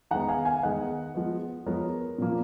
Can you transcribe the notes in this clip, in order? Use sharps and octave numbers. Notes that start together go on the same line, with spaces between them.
D#3 G#3 B3 F#5 A#5
F5 G#5
F5 G#5
D#3 G#3 B3 D#5 F#5
F3 G#3 B3
F3 G#3 B3 A#4 C#5
A#2 F3 A#3